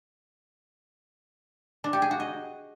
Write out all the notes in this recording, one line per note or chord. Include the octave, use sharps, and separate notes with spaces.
D4
G4
G#4
F#4
D#5